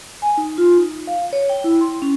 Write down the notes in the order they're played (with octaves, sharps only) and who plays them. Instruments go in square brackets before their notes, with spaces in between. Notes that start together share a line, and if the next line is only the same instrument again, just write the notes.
[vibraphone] G#5
D#4
F4
D#4
F5
C#5
G5
E4
C6
C#4